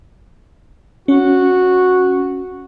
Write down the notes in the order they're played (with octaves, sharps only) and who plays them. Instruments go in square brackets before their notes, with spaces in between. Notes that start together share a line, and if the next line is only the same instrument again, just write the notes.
[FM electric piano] C#4 [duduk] F#4